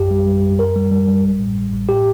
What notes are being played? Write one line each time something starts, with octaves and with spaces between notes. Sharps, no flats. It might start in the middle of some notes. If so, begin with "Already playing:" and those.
Already playing: A#1 F#2 G4
G3
G3
F#2
F#2 A#4
G3
G3
G3
A1
A2
A1
A1
A2 G4